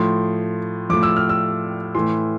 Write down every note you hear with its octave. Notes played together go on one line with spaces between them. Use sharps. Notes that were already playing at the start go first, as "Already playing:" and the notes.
Already playing: A2 F3 C6
A2 F3 D6
E6
F6
E6
A2 E3 C6